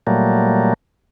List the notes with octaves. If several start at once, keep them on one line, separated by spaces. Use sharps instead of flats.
A#2 F#3 G3 A3 A#3